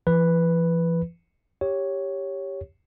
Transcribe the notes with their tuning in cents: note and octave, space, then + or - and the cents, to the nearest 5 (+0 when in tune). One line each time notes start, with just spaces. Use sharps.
E3 +45 B4 +0
G4 +0 C#5 +0